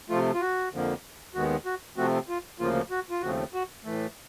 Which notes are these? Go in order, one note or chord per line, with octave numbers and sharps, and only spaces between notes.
C3 F3 A3 F4
F4
F#4
F2 D3 F3 A#3
D#2 D#3 G#3 B3 F#4
F#4
C3 F3 A3 C4 F#4
F4
D2 C#3 F3 A#3 F4
F#4
F4
D#2 C#3 F3 A3 C4 F#4
F#4
A2 E3 A3